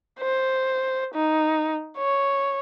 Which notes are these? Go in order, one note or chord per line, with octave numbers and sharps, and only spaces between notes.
C5
D#4
C#5